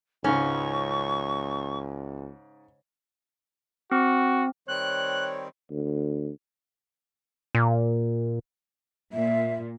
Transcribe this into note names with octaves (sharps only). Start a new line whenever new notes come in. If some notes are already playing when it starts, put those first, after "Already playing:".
C#2 G#2 C#3 C#4 C#6
C4 F#4
D#3 G3 C4 C#5 F#6
D2
A#2
A#2 E5